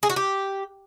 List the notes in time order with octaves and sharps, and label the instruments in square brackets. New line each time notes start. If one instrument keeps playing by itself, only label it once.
[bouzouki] G#4
F#4
G4